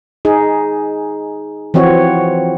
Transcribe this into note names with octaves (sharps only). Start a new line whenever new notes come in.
D#4 G#4
E3 F3 C4 F#4 C#5